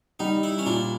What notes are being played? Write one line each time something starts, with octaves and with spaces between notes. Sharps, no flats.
G3 D#4
E4
C#4
A#2 D4